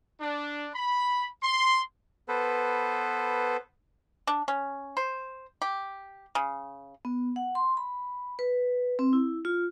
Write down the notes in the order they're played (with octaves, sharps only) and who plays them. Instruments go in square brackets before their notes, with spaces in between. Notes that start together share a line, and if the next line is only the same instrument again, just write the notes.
[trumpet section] D4
B5
C6
[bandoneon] B3 A4 B4 C5
[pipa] D4
C#4
C5
G4
C#3
[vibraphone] B3
F#5
C6
B5
B4
C4
E4
F4